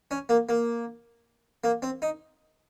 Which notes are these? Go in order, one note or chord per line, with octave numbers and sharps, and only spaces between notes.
C#4
A#3
A#3
A#3
C4
D#4